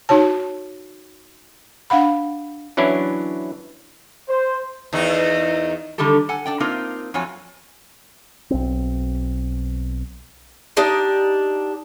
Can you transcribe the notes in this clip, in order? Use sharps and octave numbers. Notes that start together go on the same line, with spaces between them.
D#4 F#4 C#5 A5
D4 F5 F#5 B5
E3 F#3 C#4 D4 E4
C5
E2 D#3 D#4
D3 D#3 G3 G4 A4
A4 F#5 G#5
D4 D5 G5
A#3 C4 D#4 F4 A#4
F2 F#3 F4 C#5 G#5
B1 C4
D4 D#4 G4 D5